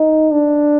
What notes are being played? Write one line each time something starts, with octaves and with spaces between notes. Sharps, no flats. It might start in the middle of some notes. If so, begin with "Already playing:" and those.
Already playing: D#4
D4